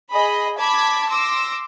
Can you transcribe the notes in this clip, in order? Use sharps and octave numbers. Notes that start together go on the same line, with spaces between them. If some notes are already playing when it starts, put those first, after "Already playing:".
G#4 D#5 B5
A5 B5 D6 G#6 B6
C6 D6 E6 A#6